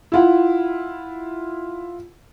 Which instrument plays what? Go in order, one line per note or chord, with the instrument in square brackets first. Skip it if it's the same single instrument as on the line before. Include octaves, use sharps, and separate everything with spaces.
[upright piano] E4 F4 F#5